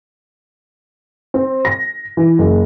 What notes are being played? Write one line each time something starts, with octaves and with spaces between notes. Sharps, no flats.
C4
A#6
E3
F#1